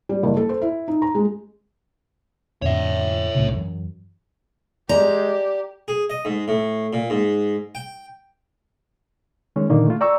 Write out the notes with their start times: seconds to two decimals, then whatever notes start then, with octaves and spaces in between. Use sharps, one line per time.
0.09 G3
0.23 F#1
0.37 A4
0.49 C5
0.62 E4
0.88 D#4
1.02 A#5
1.15 G#3
2.62 F2 A2 D3 C#5 E5
3.35 C2 A2 C#3
3.53 F#2 E3 F#3
4.89 G#3 G4 D5 A#5
5.88 G#4
6.10 D#5
6.25 G#2
6.48 A2
6.93 A#2
7.10 G#2
7.75 G5
9.56 D#3 G#3 C#4
9.69 A#2 D3 D#3 A#3
9.86 A3 F4
10.01 D5 G5 A#5 C#6 E6